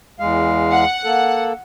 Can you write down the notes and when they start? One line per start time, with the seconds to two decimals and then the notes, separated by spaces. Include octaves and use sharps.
0.20 E2 G#3 F5
0.71 F#5
1.05 A#3 A4